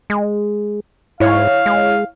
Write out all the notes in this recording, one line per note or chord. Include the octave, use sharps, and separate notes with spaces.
G#3
G#2 E4 C#5 F5
G#3